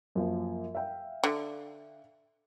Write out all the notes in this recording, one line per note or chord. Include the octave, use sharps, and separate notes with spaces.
F#2 F3 A#3
E5 F5 G5
D3